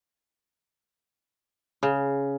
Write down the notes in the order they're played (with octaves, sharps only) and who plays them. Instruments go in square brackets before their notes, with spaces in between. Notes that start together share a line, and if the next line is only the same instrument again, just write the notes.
[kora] C#3